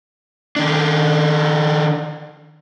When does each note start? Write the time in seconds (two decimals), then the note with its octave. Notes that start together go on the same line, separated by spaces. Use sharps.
0.56 D#3 D4